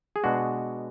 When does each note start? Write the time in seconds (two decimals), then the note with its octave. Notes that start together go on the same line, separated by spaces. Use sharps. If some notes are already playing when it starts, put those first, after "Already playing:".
0.16 G#4
0.24 B2 G#3 D4 F#4